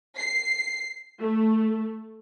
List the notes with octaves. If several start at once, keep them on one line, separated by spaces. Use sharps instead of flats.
C7
A3